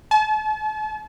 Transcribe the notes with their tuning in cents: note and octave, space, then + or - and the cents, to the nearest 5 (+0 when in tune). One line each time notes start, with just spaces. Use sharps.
A5 -40